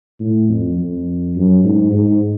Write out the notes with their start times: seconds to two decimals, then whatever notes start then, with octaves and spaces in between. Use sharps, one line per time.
0.20 A2
0.49 F2
0.78 F2
1.36 F#2
1.64 G#2
1.92 G#2